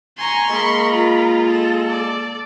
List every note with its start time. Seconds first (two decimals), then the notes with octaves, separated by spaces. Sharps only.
0.18 G#5 A#5 C6 C#6
0.50 G#3 A#3 A#4 B5
0.92 F4
1.47 A4
1.89 D5